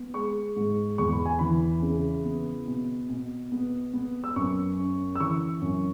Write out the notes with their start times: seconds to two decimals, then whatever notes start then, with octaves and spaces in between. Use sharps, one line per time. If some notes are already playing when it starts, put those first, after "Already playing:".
Already playing: B3
0.14 G#3 C#6
0.56 G#2
0.98 E2 C#6
1.12 B5
1.25 G#5
1.39 E3 B5
1.82 C#3
2.24 B3
2.68 B2
3.09 B2
3.52 B3
3.93 B3
4.24 E6
4.36 F#2 C#6
4.78 C#4
5.15 E6
5.20 E3 C#6
5.62 F#2